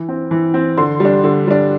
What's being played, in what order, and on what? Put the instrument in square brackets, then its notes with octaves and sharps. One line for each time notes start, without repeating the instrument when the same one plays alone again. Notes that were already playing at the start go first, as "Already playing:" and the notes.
Already playing: [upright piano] E3
C4
E3
C4
D3 C6
G3 D4
D3
G3 D4